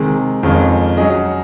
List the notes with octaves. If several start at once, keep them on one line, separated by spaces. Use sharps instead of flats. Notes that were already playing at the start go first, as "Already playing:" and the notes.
Already playing: C3 D#3 G#3
F2 D#3 G#3 C#4 F4
F#3 C#4 G#4 D#5